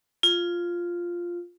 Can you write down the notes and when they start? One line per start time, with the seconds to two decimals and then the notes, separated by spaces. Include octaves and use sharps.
0.23 F4